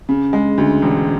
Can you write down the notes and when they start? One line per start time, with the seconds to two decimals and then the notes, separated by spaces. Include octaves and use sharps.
0.09 C#3
0.33 G#3
0.58 D2
0.82 E1